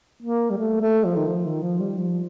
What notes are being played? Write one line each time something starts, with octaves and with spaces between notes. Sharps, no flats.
A#3
G3
A3
A3
F3
D#3
F3
D#3
F3
G3
F3